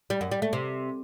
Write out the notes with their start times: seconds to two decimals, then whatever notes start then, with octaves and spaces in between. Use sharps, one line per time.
0.10 G3
0.21 F#2
0.31 G3
0.42 A3
0.53 C3